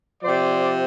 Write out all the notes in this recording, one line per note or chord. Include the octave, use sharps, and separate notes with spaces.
C3 F3 C5 D5